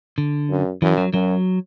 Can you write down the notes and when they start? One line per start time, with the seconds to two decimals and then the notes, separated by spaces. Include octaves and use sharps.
0.18 D3
0.50 F#2
0.82 F#2 E3
0.97 F#3
1.13 F#2 F#3